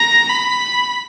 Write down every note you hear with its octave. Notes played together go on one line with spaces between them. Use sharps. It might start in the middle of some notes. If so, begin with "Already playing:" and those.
Already playing: A#5
B5